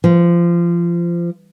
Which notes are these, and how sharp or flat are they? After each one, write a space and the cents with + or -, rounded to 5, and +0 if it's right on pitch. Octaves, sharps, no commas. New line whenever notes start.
F3 -25